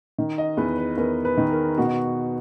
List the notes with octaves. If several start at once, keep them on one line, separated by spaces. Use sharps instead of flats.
D#3
D#5
E2 B4
B4
E2 A#4
B4
D#3
A#4
B2 F#4